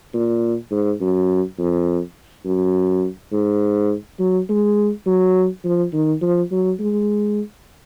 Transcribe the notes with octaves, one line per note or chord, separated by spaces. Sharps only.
A#2
G#2
F#2
F2
F#2
G#2
F#3
G#3
F#3
F3
D#3
F3
F#3
G#3